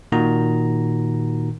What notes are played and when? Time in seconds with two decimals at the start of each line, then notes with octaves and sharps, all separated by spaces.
0.12 A#2 D#3 F#4 A#5